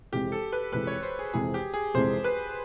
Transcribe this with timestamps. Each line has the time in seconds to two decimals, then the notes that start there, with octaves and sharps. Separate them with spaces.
0.12 F2 C3 E3 G#3 G4
0.32 A4
0.53 B4
0.72 F2 C3 E3 G#3 B4
0.87 C#5
1.03 C5
1.19 G#4
1.33 F2 C3 E3 G#3 G#4
1.54 G4
1.74 G#4
1.94 F2 C3 E3 G#3 C5
2.24 B4